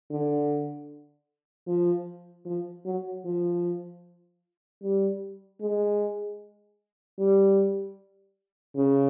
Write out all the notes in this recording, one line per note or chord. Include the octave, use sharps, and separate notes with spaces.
D3
F3
F3
F#3
F3
G3
G#3
G3
C#3